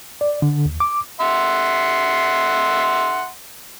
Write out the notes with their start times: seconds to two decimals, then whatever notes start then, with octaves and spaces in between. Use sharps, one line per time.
0.21 D5
0.42 D3
0.65 D#2
0.80 D6
1.21 E5 F#5 C6